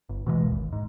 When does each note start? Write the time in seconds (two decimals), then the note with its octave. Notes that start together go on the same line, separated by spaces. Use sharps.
0.09 G1
0.26 B2 E3 F3 G#3
0.41 D1 G#1 D#2
0.72 G#2